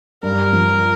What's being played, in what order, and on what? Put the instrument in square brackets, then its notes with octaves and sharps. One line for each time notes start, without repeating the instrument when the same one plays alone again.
[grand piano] G2 [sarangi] A#4
[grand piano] F3